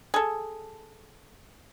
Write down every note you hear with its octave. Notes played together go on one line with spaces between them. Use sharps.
G#4 A4